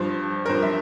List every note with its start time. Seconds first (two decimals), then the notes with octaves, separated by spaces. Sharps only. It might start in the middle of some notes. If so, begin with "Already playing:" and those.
Already playing: G2 F3 C5
0.46 A#4
0.49 G2 F3 C5
0.62 E5